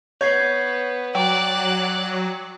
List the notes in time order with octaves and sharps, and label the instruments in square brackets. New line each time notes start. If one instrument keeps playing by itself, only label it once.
[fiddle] B3 [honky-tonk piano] C#5 [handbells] G6 G#6 C7
[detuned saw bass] F#3 [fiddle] D5 F#6 [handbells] G5